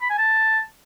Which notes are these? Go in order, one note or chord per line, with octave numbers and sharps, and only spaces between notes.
B5
G#5
A5